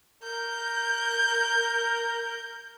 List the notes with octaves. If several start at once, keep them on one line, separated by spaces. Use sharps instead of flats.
A#4 G6